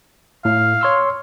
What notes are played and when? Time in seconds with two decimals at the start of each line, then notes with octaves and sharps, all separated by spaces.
0.45 A2 F5
0.81 C#5 C6 E6